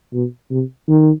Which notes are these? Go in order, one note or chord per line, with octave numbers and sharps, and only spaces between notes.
B2
C3
D#3